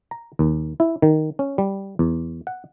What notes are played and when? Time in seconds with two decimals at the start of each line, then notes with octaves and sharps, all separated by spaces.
0.11 A#5
0.39 D#2
0.80 E4
1.02 D#3
1.39 C#4
1.58 G3
1.99 E2
2.47 F#5